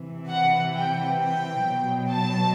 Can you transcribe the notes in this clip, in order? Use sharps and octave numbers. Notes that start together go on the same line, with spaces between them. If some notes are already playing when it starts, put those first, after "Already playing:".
Already playing: C3 E3
F#5
G5
G5
B2 F#3
A5